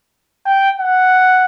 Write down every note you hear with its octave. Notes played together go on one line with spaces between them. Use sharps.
G5
F#5